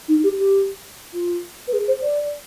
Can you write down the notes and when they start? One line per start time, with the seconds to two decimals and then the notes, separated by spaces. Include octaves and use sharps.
0.08 D#4
0.24 G4
0.38 G4
1.14 F4
1.68 B4
1.73 G#4
1.88 C5
2.03 D5